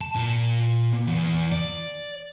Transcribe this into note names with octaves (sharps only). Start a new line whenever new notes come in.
A5
A#2
E2
D5